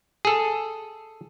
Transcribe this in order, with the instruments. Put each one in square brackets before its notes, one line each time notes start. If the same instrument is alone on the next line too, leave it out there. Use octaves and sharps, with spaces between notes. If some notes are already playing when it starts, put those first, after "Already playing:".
[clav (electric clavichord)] G#4 A4